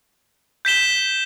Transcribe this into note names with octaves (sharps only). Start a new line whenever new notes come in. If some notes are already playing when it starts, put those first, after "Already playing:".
G6 B6 E7 G7